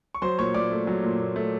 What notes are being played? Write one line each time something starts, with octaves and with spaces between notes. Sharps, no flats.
C#6
F#3 C5 C6
A#2 C#5 C#6
A#2 D5 D6
A3
F#3
A#2
A#2
A3